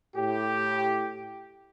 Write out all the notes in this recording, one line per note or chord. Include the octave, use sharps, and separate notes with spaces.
A2 G4